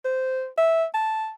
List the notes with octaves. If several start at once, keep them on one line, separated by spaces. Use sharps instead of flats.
C5
E5
A5